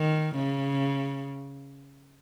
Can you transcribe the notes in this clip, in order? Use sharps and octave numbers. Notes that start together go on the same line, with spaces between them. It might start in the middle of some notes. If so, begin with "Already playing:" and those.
Already playing: D#3
C#3